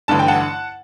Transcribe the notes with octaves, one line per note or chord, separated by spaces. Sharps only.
A1 G2 D3 A5
G5
F#5 A5